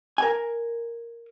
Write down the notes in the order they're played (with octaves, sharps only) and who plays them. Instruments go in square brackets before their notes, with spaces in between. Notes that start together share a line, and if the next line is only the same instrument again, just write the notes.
[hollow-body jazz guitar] A#4 G#5